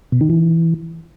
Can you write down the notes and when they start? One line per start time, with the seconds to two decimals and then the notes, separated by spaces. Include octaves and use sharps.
0.12 B2
0.21 D#3
0.30 E3